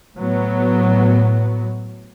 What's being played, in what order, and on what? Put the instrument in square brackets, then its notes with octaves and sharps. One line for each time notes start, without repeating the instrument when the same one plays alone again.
[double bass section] A2 F#3 B3